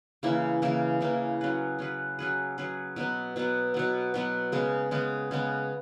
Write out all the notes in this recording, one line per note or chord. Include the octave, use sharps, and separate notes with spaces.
C#3 E3 A#3 E4
C#3 E3 A#3 E4
C#3 E3 A#3 E4
F#3 C#4 G#4 B4
F#3 C#4 G#4 B4
F#3 C#4 G#4 B4
F#3 C#4 G#4 B4
B2 F#3 B3
B2 F#3 B3
B2 F#3 B3
B2 F#3 B3
C#3 G#3 B3
C#3 G#3 B3
C#3 G#3 B3